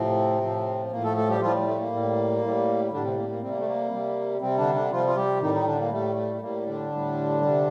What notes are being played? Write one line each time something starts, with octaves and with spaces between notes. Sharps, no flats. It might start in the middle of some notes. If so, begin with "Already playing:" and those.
Already playing: A2 C3 F3 C4
A2 F3
A2 F3 A#3
A3 A4
A3 A4
G3 G4
A2 F3 G3 F4
A3
A#3
A2 G3
A2 G3
A2 D3 G3 D4
C3 C4
A#3
A#3
C3 G3 C4
A#3
A3
A#3
C3 G3
C3 G3 C4
D3 D4
D3 D4
C3 F3 G3 F4
F4
G3 G4
A2 D#3 G3 D#4
D#3 D#4
D3 D4
A#3
A2 G3 A3
A3
A3
A2 G3 A#3
D3 D4
A2 G3
C3 G3